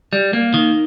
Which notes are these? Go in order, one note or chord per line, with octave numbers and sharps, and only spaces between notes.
G3
A#3
D#3